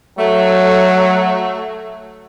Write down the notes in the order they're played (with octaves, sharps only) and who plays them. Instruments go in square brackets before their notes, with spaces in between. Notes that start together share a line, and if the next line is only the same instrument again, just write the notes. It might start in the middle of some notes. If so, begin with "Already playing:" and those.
[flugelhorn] F#3 [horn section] A3